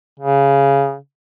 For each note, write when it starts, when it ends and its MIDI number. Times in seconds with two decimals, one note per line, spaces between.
0.20 0.96 49